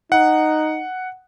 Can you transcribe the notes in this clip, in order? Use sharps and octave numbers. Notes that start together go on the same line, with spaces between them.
D#4 F#5